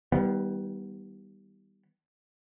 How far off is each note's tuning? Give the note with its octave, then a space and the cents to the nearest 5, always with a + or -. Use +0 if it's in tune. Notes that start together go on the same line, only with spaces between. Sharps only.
D#3 +40 G3 +0 B3 +0